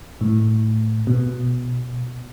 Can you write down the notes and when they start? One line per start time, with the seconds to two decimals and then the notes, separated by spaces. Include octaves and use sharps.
0.21 A2
1.07 B2